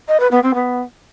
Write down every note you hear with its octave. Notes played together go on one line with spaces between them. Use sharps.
D#5
B4
B3
C4
B3